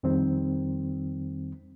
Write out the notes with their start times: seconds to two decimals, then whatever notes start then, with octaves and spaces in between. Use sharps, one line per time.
0.03 F2 D#3 G3 C4